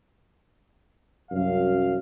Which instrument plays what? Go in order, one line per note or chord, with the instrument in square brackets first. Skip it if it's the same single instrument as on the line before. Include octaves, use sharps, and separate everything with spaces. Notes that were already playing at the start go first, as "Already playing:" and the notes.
[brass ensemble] C2 F#2 F5